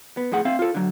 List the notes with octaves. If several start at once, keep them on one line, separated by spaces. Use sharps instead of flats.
B3
F2 A2 G#4 F#5
C4 E5 F5
F4 A4
D3 F#3